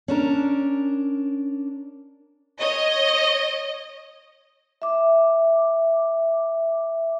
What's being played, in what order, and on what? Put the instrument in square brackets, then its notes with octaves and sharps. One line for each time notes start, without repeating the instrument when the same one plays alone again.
[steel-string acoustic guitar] C#4 D4 A#4
[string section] C#5 D#5
[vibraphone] E5 D6